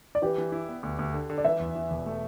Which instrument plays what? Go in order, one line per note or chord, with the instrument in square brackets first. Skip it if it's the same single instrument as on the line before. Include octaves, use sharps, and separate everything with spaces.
[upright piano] D5
[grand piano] E3 [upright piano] G4 B4
[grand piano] E3
E4
B3
D2
D2
D3
D3
[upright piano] D5
[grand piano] E3 [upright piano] B4 E5
[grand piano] E2
E3
E1
A3